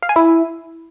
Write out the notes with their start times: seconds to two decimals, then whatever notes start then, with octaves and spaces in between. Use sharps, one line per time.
0.03 F5
0.09 G#5
0.16 E4